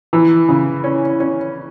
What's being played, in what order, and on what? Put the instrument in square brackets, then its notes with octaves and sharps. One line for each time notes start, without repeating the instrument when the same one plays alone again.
[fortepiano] E3
C#3
C#4
C#4